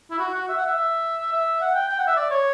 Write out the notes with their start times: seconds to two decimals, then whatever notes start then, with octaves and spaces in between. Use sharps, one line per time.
0.10 E4
0.19 F#4
0.34 F#4
0.48 E5
0.57 F#5
0.66 E5
0.76 E5
1.32 E5
1.61 F#5
1.74 G5
1.88 G5
1.98 F#5
2.07 E5
2.17 D5
2.31 C#5